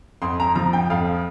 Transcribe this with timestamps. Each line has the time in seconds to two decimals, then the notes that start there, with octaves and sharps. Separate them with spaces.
0.22 F2 C6
0.40 A#5
0.55 F3 A#5
0.73 G5
0.90 F2 F5